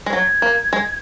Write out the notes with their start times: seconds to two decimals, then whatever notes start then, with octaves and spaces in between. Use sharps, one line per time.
0.06 G#3
0.12 F#3 G#6
0.42 A#3
0.73 G#3